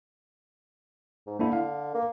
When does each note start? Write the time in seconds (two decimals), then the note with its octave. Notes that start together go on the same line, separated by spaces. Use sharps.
1.27 G#2
1.39 D3 A#3 D4 E4
1.53 F5
1.94 A#3